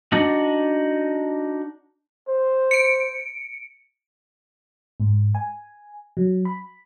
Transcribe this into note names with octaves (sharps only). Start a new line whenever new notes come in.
D4 D#4 F#4
C5
C#7 D7
G#2
G#5
F#3
B5